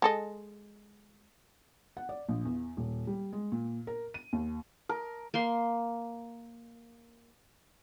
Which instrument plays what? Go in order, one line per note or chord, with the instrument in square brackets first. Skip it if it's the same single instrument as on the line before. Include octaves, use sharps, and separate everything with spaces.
[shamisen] G#3 A4 D#5
[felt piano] F#5
D5
A#1
E2
D#1
G3
G#3
A#2
A#4
D#7
D#2
[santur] A#4
[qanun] A#3 C6